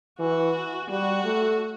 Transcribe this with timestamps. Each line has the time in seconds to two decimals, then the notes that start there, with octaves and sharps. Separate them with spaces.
0.20 E3 F#4
0.90 G3 F#4
1.25 A3